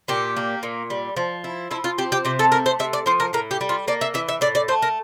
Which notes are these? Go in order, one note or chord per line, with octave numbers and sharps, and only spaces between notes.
A#2 G4
A#3
A#2
G3
F3
E4
F3 E4
F4
C4 G4
G4
C3 G4
A4
A3 A#4
C5
C3 E5
D5
F3 C5
A#4
A2 A#4
G4
G3
F4
A#3 D5
E5
E3 E5
E5
A2 D5
D5
A3 C5
A#4